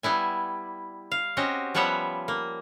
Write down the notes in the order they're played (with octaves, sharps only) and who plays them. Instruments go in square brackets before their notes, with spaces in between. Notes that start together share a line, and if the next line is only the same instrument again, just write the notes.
[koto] G3 B3 E4 G#5
F5
C4 C#4 F#4 G4 D#5
F3 G3 B3 C#5 E5 F#5
A#3